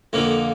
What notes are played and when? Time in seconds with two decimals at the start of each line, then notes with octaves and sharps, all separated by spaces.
0.13 F2 D3 F3 A#3